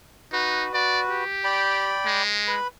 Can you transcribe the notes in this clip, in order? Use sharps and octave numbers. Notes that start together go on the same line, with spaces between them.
D#4 F#4 B4
F#4 B4 D5
G4
D5 G5 B5
G#3
B4 B5